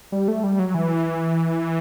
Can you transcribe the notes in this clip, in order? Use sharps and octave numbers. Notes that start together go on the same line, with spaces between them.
G3
A3
G3
F#3
E3